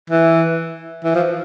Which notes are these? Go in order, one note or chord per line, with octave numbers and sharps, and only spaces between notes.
E3
E3
F3